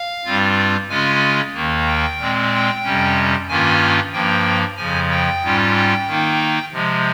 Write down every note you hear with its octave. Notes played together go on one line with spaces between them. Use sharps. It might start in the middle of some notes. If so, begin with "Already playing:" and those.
Already playing: F5
G2 G3 C4 F4
C#3 G#3 C#4 F4 G#5
D#2 D#3 A#3
G5
A#2 G#3 C4
G5
F2 C3 G3 C#4
G2 D#3 A#3 C#4 F4 G#5
G2 F3 A#3 G5
F2 C#3 F3 G#5
G5
G#2 G3 C#4 F4
G5
D#3 A#3 D#4
C3 F3 G#3